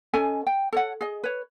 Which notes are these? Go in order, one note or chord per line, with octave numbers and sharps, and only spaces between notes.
C#4 A4 D#5 G#5
G5
A4 C#5 F#5
G#4 D#5
B4 C#5